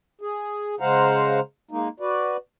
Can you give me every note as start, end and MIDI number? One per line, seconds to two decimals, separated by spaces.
0.21 0.75 68
0.80 1.40 49
0.80 1.40 56
0.80 1.40 72
0.80 1.40 77
0.80 1.40 78
0.80 1.40 82
1.71 1.88 56
1.71 1.88 58
1.71 1.88 63
2.00 2.37 66
2.00 2.37 71
2.00 2.37 74